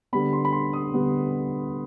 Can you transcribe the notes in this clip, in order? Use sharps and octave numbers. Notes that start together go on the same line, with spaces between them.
D3 G3 B3 B5
C6
B5
C6
D#6
D3 G3 B3